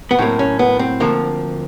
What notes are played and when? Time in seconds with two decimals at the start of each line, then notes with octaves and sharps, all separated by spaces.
0.11 B3
0.19 A2 F#3 A#3 C4
0.39 C#4
0.59 B3
0.79 C4
1.00 D2 D3 F3 A#3